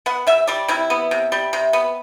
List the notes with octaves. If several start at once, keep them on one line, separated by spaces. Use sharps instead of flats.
B3 F#5
C3 E5
G3 D5
C3 E4
B3
C3
G3
C3
B3